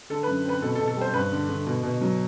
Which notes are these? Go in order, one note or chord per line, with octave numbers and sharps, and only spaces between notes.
D3 A4
B4
F#2
C4 B4
B2 A4
A4
B2
A4
G3 C5
G2 B4
D3
D3
B2
B2
F#3